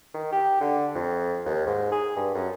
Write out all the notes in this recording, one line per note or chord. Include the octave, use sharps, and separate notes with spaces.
D#3
G4
D3
F2
D#2
G#2
G#4
G2
F#2